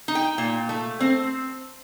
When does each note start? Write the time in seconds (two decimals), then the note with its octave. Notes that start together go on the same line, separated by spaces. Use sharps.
0.08 D#4
0.15 G5
0.38 A#2
0.69 A3
1.00 C4